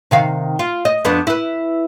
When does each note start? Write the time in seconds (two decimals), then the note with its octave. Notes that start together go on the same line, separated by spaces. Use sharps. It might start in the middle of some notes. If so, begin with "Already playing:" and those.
0.11 C3 D#3 F5
0.59 F4
0.85 D#5
1.05 F2 B3 D4
1.27 E4 B4